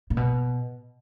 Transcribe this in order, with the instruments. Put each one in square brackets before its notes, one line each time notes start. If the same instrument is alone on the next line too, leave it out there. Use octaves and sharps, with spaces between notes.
[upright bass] A#2
B2